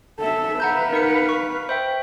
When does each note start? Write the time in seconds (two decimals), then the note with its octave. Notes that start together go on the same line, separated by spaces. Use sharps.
0.20 A4 E5
0.60 B4 F5 F#5 A#5 G6
0.92 D#4 A#4 C#7
1.29 C#6
1.69 C5 E5 G5